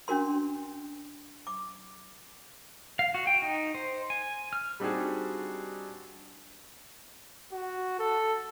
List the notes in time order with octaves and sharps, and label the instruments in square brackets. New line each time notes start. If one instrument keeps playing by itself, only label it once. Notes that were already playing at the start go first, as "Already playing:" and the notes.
[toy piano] C#4 D4 F#4 A#4 C6
D6
[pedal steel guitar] F5
F#4
G5
D#4
C5
G#5
F6
[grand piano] G3 C4 D4 D#4 F#4 G#4
[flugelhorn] F#4
A4